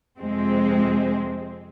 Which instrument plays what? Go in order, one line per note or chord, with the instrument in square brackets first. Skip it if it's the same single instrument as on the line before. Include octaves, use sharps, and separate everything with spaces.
[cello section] F2 C3 G#3 C4